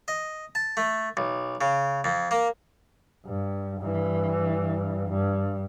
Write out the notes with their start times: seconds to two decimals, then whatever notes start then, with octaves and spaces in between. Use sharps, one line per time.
0.08 D#5
0.55 A5
0.77 A3
1.17 B1
1.61 C#3
2.04 F2
2.31 A#3
3.26 G2
3.81 G2 E3
5.09 G2